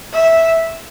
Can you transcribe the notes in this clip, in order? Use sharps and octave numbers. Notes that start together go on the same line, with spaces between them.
E5